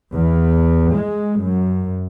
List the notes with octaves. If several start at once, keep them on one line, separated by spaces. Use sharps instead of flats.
E2
G#3
F#2